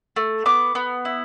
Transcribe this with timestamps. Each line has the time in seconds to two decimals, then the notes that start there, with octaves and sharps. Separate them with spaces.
0.16 A3
0.46 B3 D6
0.75 B3
1.05 E4